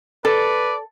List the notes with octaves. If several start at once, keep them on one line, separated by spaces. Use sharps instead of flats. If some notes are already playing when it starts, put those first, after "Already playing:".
A4 B4 D5